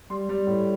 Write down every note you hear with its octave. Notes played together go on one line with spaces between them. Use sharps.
G3 C6
G3
A2